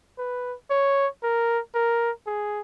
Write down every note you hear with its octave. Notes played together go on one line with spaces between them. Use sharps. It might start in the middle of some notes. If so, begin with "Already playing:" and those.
B4
C#5
A#4
A#4
G#4